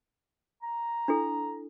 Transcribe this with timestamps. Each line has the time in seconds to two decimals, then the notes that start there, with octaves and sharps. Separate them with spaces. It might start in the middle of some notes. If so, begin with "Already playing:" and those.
0.63 A#5
1.08 D4 E4 A4